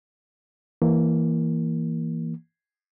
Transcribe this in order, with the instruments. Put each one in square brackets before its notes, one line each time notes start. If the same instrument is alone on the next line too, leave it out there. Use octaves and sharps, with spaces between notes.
[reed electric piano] E3 A#3